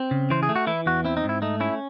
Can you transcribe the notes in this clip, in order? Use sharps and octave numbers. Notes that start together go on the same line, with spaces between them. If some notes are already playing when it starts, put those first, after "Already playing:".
Already playing: C4
C#3
E3 C5
G#4
A3
F#4
E3 E4
E2 F#4
C4 E4
D#4
G#2
E4
A3 D#4
C#4 E4